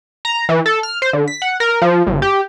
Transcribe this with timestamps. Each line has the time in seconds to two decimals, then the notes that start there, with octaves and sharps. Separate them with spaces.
0.25 A#5
0.49 E3
0.66 A4
0.83 F6
1.02 C5
1.13 D3
1.28 B6
1.42 F#5
1.60 A#4
1.82 F3
2.07 G1
2.22 G4